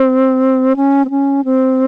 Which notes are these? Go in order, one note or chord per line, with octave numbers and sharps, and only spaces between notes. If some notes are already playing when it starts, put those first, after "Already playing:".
Already playing: C4
C#4
C4
C#4
C4